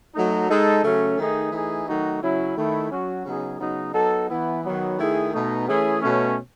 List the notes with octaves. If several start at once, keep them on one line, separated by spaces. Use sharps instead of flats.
F#3 A3 D#4
G#3 D#4 A4
C#3 F#3 A3 C#4
D#3 A3 D#4 G#4
E3 A3 D#4 G#4
D#3 F#3 A3 D#4 F#4
C#3 F#3 C#4 E4
D#3 A3 E4
F#3 C#4 F#4
C#3 F#3 B3 D#4 G#4
C#3 F#3 B3 D#4
F#3 B3 D#4 A4
E3 B3 E4
D#3 F#3 B3
D#3 A3 E4 G#4
B2 A3 D#4
E3 A3 C#4 E4 G#4
B2 A3 C#4